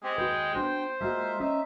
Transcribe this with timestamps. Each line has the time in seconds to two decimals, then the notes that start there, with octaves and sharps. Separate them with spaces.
0.03 G#3 C4 G4
0.18 D#2 F#4 B4 G5
0.54 B3 D4 F#4 C5
1.01 G#3 A#3 D#4 F4 F#4 E5
1.40 C#4 D#4 D#5 E5